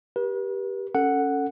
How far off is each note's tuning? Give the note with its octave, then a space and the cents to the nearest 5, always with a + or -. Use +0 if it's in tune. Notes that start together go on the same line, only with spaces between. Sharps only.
G4 +0 B4 -40
C#4 +0 A4 +20 F#5 +0